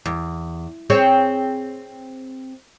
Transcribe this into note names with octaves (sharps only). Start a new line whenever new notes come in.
E2
C4 G#4 C#5